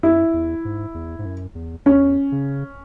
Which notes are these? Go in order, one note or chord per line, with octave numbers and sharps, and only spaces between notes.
F#2 E4
E2
G#2
E2
G#2
F#2
E2
E2 C#4
C#3